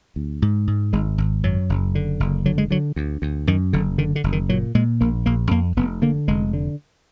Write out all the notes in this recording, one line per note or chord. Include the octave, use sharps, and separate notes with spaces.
D2
G#2
G#2
G#1 G#3
G#1
F#2 F#3
F#1
D3
F#1
D3 F#3
G#3
D3 F#3
D2
D2
F#2 D#3
F#1 D3
D3 D#3
D3
F#1
D#3
A#2 F#3
A#2 G#3
A#1 A#3
A#1 A#3
F2 A#3
F1 B3
D3 A#3
F1 G#3
D3